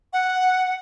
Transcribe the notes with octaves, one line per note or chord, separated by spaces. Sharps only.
F#5